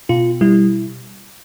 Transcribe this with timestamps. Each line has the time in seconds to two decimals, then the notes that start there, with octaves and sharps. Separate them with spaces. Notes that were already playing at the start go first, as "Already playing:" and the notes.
0.09 B2 F4
0.41 G3 E4